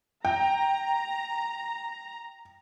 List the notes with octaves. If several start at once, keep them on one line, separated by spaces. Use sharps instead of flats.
G5 A#5